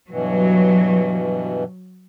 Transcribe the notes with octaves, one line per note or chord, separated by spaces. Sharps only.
G2 B2 E3 F#3